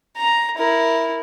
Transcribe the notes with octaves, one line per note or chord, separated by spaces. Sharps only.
A#5
E4 A#4